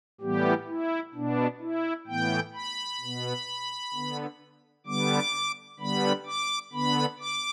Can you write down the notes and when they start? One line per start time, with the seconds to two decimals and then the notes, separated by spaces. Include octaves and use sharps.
0.21 A2 E3 G3 B3 G4
0.67 E4
1.14 B2 B3 D4
1.61 E4
2.07 A2 E3 B3 G5
2.54 B5
3.00 B2 B3
3.94 D3 B3
4.86 D3 G3 B3 D6
5.79 D3 G3 B3 B5
6.26 D6
6.73 D3 B3 B5
7.19 D6